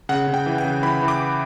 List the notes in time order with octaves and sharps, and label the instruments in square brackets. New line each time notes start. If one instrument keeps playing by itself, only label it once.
[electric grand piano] C#3 F#5
C#3
G5
E3
G5
C#3
E3 B5
E3
D6